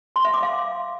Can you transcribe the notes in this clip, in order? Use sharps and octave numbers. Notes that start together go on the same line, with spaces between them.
C6
E5
D6
F5